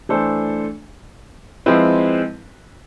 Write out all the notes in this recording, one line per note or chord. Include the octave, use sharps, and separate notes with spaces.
E3 A3 D4 A4 C5
F3 G#3 C4 E4 B4